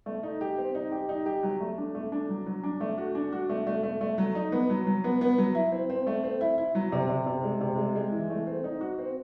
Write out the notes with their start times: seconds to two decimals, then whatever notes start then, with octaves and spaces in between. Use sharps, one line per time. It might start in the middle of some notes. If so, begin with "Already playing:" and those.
0.06 A3
0.23 D#4
0.41 G4
0.58 C4
0.75 D#4
0.92 G4
1.09 D#4
1.26 G4
1.43 F#3
1.60 A3
1.78 D4
1.95 A3
2.12 D4
2.29 F#3
2.46 F#3
2.64 D4
2.81 A3
2.98 F#4
3.15 D4
3.32 F#4
3.49 A3
3.67 A3
3.83 A3
4.01 A3
4.18 F#3
4.35 D#4
4.52 B3
4.70 F#3
4.87 F#3
5.04 B3
5.21 B3
5.38 F#3
5.55 E4
5.72 C4
5.90 C4
6.07 A3
6.23 C4
6.41 E4
6.58 E4
6.75 F#3
6.92 C3
7.09 C3
7.26 C3
7.43 G#3
7.61 C3
7.78 G#3
7.96 G#3
8.12 E3
8.30 A3
8.47 C4
8.64 D#4
8.81 F#4
8.98 C4